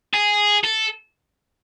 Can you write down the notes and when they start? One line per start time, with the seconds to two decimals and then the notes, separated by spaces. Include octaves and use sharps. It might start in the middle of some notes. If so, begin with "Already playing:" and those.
0.14 G#4
0.64 A4